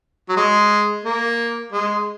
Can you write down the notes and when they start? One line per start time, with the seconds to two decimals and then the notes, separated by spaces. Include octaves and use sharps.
0.29 F#3
0.37 G#3
1.04 A#3
1.72 G#3